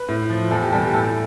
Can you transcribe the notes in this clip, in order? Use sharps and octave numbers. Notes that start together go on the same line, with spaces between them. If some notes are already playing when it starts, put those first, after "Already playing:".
Already playing: B4
A2
F3
E2 A4
G4
B2 G3 A4
G4
A2 A4